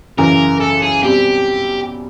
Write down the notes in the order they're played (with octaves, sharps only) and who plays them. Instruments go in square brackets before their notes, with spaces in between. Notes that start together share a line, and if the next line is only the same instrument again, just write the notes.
[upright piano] F#2 C#3 E3 [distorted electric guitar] A#4
[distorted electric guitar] A4
G#4
[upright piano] B2 G3 C4 [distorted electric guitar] G4